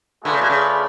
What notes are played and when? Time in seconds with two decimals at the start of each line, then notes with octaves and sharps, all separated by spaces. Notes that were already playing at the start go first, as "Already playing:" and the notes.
0.25 D3 A3 F4 G#4 B4 D5
0.33 C#3
0.41 B2
0.50 C#3